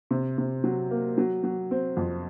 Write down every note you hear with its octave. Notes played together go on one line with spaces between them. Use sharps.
C3
C3
F#3
A#3
F#3
F#3
C4
F2